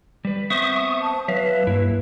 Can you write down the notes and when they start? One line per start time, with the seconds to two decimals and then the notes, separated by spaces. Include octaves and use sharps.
0.25 G3 B4
0.50 B3 C4 C5 E5 C#6 D#6
1.02 A5
1.28 F#3 B4 E5 F5
1.67 G2 A#3 E4